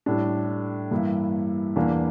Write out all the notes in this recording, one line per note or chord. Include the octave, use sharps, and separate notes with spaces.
A2 G3 D4
G2 E3 A#3 E4
E2 E3 A#3 D4